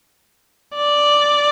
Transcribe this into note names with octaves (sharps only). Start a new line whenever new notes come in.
D5